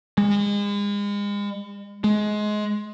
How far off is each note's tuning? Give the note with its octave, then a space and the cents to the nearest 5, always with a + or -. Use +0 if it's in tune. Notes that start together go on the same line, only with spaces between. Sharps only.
G#3 -35
G#3 +20